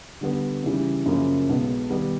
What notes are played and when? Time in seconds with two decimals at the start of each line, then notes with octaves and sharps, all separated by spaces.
0.21 D3 G3 B3
0.64 C#3 E3 G3
1.06 F#2 C#3 F3 A#3
1.49 B1 B2 G#3 B3
1.90 D#3 G3 B3